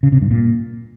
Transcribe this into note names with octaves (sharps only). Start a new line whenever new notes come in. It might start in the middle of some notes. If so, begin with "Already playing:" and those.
C#3
C3
G2
A#2